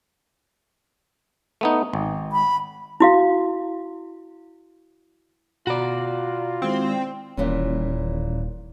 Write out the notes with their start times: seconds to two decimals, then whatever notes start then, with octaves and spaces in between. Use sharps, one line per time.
1.61 A3 B3 D#4
1.93 G#1
2.32 B5
3.00 E4 F#4 F5
5.67 B2 F4 F#4 D5 A#5 B5
6.62 D#3 G#3 C4 E4
7.37 D#1 A#2 E3 C#4